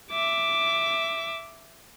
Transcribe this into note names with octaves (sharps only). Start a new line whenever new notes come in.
E5 D6